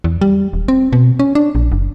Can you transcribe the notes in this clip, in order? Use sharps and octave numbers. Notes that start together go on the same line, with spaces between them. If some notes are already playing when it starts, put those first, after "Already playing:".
E2
G3
D#1
C4
B2
C#4
D4
A#1
F#1